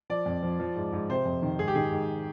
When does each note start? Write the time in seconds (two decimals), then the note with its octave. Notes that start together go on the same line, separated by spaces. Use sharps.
0.10 F3 D5
0.26 F2
0.43 F3
0.60 F3
0.76 G#2
0.93 G#2
1.10 C3 C5
1.26 F2
1.42 D#3
1.59 G#2 G#4
1.68 G4
1.75 D#3 G#4
1.92 G#2